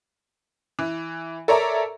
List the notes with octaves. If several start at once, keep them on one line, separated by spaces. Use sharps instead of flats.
E3
A4 A#4 C#5 D5 E5 A#5